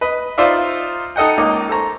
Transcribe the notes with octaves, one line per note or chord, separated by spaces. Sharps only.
B4 D#5
D#4 F4 C5 D5 E5 F5
D#4 A4 D#5 F#5 G5
C#2 A#3 D#4 D#5 D6
A4 C5 A#5 C#6